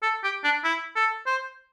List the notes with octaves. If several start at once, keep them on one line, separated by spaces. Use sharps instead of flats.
A4
G4
D4
E4
A4
C5